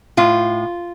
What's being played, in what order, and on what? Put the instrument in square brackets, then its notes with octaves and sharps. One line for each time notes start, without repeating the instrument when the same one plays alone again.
[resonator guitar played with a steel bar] A2 F4